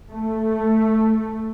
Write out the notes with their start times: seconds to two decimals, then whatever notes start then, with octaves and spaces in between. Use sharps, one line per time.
0.11 A3